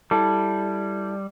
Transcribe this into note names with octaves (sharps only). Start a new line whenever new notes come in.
G3 E4 A4